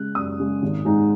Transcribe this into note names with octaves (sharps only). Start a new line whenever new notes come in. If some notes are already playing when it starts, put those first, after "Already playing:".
Already playing: C#3 G#3 F#6
F#2 D#6
C#3 G#3
G#1
G#2 G#3 D#4